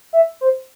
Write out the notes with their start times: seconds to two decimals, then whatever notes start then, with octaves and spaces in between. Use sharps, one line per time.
0.13 E5
0.41 C5